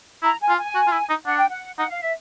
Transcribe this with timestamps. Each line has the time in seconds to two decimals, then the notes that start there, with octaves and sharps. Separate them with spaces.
0.23 E4 A#5
0.41 G#5
0.49 F4
0.57 G#5
0.75 F#4
0.87 F4
0.92 E4
1.09 D#4
1.26 D4 F#5
1.38 G5
1.49 F#5
1.78 D#4 F#5
1.90 F5
2.01 E5